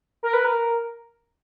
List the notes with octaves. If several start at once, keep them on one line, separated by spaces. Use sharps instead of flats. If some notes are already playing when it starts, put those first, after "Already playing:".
A#4
B4
A#4